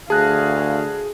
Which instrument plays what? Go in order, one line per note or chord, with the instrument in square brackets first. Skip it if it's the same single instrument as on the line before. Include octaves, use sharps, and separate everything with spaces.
[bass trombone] D2 [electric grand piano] G#4 [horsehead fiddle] F5 [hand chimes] A5 F#6 A#6